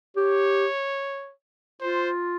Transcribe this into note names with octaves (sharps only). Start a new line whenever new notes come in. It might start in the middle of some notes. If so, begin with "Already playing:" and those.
G4 C#5
F4 C5